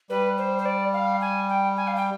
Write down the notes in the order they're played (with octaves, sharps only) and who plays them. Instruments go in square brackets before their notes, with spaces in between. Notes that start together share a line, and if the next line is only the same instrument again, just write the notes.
[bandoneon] G3 [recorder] B4
[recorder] C5
C5
D5
F5
G#5
G5
G#5
F5
G5